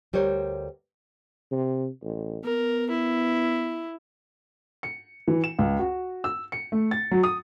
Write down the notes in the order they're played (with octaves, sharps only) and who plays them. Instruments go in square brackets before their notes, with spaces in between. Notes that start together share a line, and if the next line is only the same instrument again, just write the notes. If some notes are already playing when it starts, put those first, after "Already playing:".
[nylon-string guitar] D2 G3 A#4 C5 C#5
[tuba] C3
A1
[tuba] B3 [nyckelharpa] A#4
[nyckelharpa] E4
[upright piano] C#7
E3
E7
C#2
F#4
E6
C#7
A3
A6
F#3
D#6